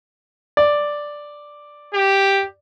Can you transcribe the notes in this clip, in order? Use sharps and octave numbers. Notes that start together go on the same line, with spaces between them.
D5
G4